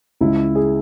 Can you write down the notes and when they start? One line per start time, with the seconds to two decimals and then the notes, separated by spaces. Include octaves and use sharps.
0.21 C#2 C#3 G#3 E4
0.55 G#4